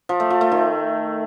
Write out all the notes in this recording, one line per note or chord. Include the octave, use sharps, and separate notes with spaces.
F3
A3
F3
A3
D#3